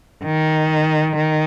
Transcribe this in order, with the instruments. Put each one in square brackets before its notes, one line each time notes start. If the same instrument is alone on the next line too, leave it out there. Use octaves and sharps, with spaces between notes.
[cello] D#3
D#3